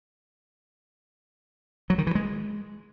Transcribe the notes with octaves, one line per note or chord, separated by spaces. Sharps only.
F#3
D#3
E3
G#3